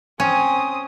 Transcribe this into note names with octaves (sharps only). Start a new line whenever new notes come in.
C4 C#4 D#6